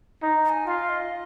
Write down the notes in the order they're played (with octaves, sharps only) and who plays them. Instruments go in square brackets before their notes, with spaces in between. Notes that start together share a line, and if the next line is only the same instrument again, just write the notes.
[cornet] D#4
[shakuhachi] A#5
G#5
[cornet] F4 [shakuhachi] F5
[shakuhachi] D#5